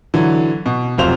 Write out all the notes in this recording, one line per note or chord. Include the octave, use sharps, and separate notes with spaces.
D3 E3 F#3
B2
F1 F2 F#3 F4 C5 F7